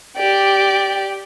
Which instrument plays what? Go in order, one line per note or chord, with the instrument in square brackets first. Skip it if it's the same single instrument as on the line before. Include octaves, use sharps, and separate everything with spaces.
[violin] G4 D5